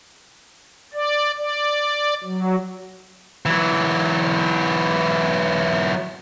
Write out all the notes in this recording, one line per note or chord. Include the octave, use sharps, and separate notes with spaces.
D5
D5
F#3
E3 F#3